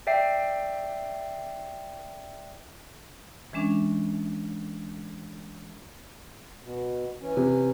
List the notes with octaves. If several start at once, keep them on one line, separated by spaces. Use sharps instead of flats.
D5 E5 G5 C7
E3 G#3 C#4 D4
B2
E3 C#4
C3